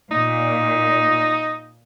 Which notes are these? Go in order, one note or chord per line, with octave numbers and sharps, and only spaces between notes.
A#2 D#4